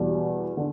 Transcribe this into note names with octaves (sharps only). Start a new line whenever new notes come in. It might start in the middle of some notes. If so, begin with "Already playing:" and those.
Already playing: E2 B2 G3
D3